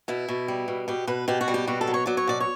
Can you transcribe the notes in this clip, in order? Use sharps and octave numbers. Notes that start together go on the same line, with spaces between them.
B2 E4
B2
G3
B2
B2 G4
B2 B4
B2 G4
F#4
G3
G4
B2 F#4
A4
F#3
C#5
F#3 D5
C#5
B2 D5
C#5